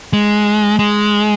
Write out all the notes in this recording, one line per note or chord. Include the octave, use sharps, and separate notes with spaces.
G#3
G#3